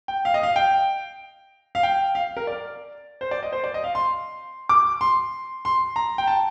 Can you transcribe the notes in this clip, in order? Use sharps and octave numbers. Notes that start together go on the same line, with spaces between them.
G5
F5
D#5
F5
G5
F5
G5
F5
A#4
D5
C5
D5
D#5
C5
D5
D#5
F5
C6
D6
C6
C6
A#5
G5
A5